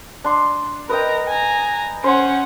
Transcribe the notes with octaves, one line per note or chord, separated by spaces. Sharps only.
D4 C6
A#4 B4 D#5 G5 A#5
G#5 A#5
C#4 C5 F#5